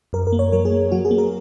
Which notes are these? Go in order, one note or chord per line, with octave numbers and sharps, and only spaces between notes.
F#2 A#4
A#4
A#3
C#5
F#3 A#4
G#4
A#3
F#3 F#4
G#4
A#3
A#4